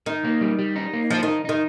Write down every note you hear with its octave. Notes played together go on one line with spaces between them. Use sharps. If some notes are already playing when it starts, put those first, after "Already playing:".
D#3 D#4
A#3
G3
G3
D#4
A#3
F3 D#4
D#3
D#4
D#3 D#4